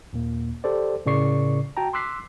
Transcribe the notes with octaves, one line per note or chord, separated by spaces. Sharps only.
D#2 A#2 A#3
G4 A4 C5 D5
A2 C#3 A#4 D5 C#6 C7
F#4 G5 A5 A#5
C6 D6 E6 F#6 B6 C7